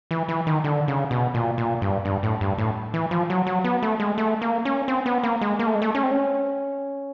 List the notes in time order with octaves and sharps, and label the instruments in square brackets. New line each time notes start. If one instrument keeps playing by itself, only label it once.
[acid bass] E3
E3
D#3
D3
C#3
B2
A#2
A#2
G2
G2
A2
G2
A2
E3
F3
F#3
F#3
B3
A3
G#3
A3
A#3
C#4
C4
B3
A#3
G#3
A#3
A3
G#3
A3
C#4
C4
C#4